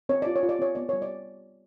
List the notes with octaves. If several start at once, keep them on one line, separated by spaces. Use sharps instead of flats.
C4 C#5
F4 D5
C#5
F4
D5
C4 C#5
B3 D5
G3 C#5
D5